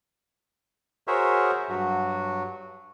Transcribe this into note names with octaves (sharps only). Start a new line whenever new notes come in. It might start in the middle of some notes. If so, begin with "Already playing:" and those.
F#4 G#4 A#4 C5 C#5 E5
G2 F#3 F#4